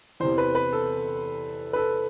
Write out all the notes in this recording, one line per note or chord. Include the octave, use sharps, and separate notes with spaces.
E2 C3 E3 C5
B4
B4
A4
B4
A4